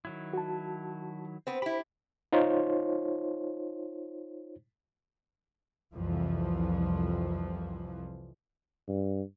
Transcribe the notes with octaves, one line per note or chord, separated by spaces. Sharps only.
D#3 F#3 E4
F#4 A5
B3 C4 C5
E4 G4 B5
D#4 F4 C5 C#5
C2 F2 E3 F3
G2